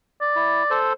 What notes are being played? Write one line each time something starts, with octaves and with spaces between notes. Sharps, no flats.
D5
E4
A4 C5